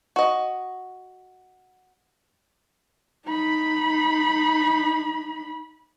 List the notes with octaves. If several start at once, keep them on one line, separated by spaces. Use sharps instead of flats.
F#4 D#5
D#4 B5